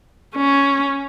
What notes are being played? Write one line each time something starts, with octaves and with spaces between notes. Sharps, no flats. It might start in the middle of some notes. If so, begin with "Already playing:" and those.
C#4